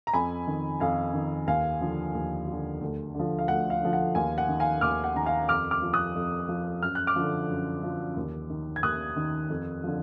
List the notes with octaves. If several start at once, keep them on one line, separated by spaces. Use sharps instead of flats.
A#5
F2 G#5 B5
D#3
F2 F5 G#5
D#3
D#2 F5 G#5
D3 F3
D#2
D3 F3
D2
D3 F3
F5
D2 F#5
F5
D3 F3
F#5
D#2 F5 G#5
F#5
D#3
F5 G#5
D#2 D6 F6
F#5
D#3 A#5
F5 G#5
F2 D6 F6
D6 F6
F3
D#6 F#6
F2
F3
F#2 F6
F#6
D6 F6
D3 F3
F#2
D3 F3
D#2
D#3
G#6
D#2 D#6 F#6
D#3
F2
D3 F3